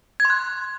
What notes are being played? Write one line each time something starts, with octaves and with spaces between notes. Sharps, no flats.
G#6
C6
F#6